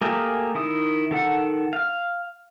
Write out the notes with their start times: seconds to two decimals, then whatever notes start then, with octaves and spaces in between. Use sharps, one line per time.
0.01 A3 A#3 G4 G#4 A#4
0.55 D#3 E4 D#6
1.11 D#3 A4 F#5
1.73 F5 F6